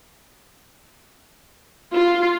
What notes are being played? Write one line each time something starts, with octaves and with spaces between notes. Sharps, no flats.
F4